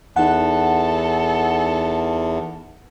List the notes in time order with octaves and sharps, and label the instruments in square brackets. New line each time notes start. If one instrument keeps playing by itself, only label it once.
[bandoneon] E2 [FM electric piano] D#4 F#5 [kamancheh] A4